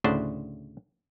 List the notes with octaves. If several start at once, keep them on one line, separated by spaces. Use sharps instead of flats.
D2 A2 C#3 D4 C5 F#5